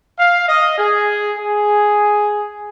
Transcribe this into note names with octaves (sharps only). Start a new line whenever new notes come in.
F5
D#5
G#4
G#4